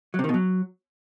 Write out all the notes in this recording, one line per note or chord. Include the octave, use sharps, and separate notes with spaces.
F#3
C3
D#3
B2
F#3